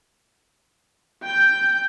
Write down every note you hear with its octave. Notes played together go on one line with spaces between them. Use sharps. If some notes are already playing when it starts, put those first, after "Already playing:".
G5 G6